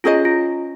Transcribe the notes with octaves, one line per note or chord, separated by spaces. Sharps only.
C#4 F4 G#4 C5 D#5
F4